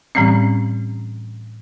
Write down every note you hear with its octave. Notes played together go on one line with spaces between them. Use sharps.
A2 E3 G3 C4 C#4